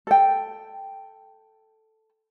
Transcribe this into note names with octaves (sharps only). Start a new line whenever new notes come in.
A4 G5